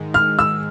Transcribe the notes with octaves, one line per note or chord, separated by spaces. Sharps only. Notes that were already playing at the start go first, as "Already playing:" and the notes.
Already playing: G#2 D#3 G#3
F6
E6